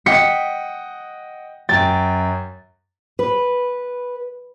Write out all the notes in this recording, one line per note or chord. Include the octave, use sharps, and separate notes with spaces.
D#5 F#5 G5 B6 C#7
F#2 G5 A6
B4